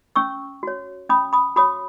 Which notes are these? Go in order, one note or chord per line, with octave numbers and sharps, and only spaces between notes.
C#4 C#6 E6
F#4 C#5
C#4 B5 D#6
B5 D#6
F#4 C#5 B5 D#6